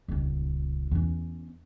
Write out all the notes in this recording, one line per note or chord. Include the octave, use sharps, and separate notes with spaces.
D#1 C#2
E2 C#4